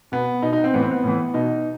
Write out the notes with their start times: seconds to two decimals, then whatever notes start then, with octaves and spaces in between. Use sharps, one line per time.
0.12 B2 B3
0.42 B2 D#4
0.53 D#4
0.64 C4
0.74 A2 E3 B3
0.82 C4
0.91 B3
1.04 A2 E3
1.34 B2 D#4